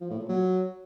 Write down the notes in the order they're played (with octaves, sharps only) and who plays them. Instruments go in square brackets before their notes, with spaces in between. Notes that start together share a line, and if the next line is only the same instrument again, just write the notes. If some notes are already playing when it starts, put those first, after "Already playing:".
[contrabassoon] F3
A2
A#2
F#3